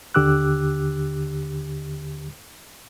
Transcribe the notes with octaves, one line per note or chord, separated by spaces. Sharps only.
D#2 D3 G4 D6 E6 F#6